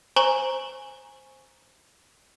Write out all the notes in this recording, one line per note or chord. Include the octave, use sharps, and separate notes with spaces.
C5 G#5 A#5 C#6 F#7 G7